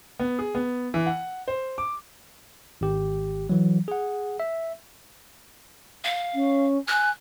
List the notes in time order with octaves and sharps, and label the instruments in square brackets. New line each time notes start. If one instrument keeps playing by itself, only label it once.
[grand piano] B3
G#4
B3
E3
F#5
C5
D6
[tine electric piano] G#1 G4
E3 F#3
G#4 F#5
E5
[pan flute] F5
[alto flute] C#4
[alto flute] G#5 [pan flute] F#6